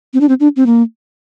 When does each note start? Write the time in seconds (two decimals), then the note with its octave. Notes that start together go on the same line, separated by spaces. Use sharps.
0.14 C4
0.21 D4
0.29 C4
0.40 D4
0.56 C4
0.66 A#3